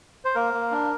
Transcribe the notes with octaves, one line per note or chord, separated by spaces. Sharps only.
C5
A#3 A#4
A#3
D4